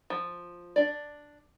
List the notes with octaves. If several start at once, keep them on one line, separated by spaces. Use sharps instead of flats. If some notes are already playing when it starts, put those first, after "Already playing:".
F3
D4 D5